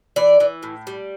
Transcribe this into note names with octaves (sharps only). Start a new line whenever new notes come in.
E3 D5
E3
A2
G3